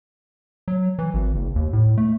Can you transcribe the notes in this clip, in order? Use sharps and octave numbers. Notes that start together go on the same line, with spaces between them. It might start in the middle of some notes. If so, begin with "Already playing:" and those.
F#3
E3
G#1
F#1
D#2
A2
A3